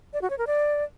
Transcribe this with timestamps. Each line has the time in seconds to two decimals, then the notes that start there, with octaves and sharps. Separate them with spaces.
0.13 D5
0.22 F#4
0.30 C#5
0.38 A#4
0.47 D5